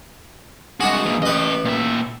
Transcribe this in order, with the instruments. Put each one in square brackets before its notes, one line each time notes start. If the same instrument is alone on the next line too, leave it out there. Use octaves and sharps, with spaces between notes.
[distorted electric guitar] C2 F#4 [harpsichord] G#3 D4 G#4
[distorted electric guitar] A#2 E3
[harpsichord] A1 B4 [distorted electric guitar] G4 D#5
[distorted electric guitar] A#2 E5